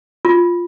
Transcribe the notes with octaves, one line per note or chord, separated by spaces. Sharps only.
F4